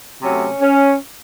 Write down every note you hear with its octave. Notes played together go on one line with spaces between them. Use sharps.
C3 F#3 A3 C#4
C#4